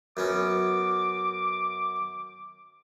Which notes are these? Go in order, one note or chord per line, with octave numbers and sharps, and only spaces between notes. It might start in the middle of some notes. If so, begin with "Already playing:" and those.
F#2 B3 C#4 D6